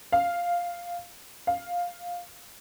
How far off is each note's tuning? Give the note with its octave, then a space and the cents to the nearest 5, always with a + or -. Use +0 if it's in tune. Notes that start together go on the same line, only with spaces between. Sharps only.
F5 -5
F5 +10